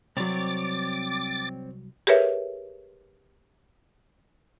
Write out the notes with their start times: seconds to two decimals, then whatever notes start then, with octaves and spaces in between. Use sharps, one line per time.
0.17 C2 F#3 C4 C#5 D5 D6 A6
2.07 G4 G#4 A#4 B4 C#5 E5